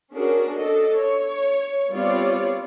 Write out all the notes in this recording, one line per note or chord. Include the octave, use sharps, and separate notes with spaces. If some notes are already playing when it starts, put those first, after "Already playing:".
C#4 D4 F#4 G#4 A#4
D4 A4 D#5
C#5
G3 B3 C4 F4 C#5 D5